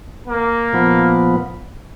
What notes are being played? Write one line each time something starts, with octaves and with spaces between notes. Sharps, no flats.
A#3
A#2 F3 B3